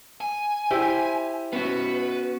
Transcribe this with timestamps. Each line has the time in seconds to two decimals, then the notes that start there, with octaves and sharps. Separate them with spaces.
0.21 G#5
0.70 E4 G4 C5
1.53 B3 C#4 F#4 B4